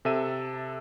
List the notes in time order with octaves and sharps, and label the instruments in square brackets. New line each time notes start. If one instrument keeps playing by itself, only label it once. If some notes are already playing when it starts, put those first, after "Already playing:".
[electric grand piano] C3 A4 E5 D#7